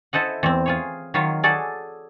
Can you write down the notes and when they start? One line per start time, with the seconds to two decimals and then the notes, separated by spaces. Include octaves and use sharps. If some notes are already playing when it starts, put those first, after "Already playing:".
0.13 E4 A4 C5 D#5 F#5
0.43 E2 C4
0.66 F4 G#4 C#5
1.14 D#3 F#3 F4 C#5
1.43 F#4 G#4 A4 D5